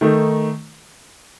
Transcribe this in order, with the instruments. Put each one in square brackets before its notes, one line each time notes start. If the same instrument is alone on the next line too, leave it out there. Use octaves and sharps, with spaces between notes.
[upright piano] D#3 A3 D#4